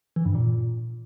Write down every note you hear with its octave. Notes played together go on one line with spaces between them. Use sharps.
E3
G2
A#2